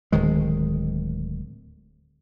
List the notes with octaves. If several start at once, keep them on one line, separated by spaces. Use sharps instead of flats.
D1 D#3 G#3